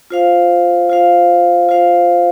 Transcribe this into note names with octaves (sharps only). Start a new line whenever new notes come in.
F4 C5 F5
F4 C5 F5
F4 C5 F5